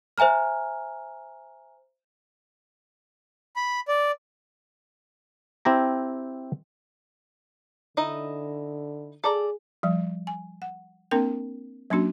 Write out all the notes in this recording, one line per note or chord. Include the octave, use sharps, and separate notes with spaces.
C5 E5 G#5 A#5 F6
B5
D5
C4 E4 G4 A#5
D3 D#4 E4 D#5
G#4 A4 D5 A#5
F3 G3
G#5
F#5
A#3 C4 D4 A#4 G5
F#3 A#3 C#4 D4 F#4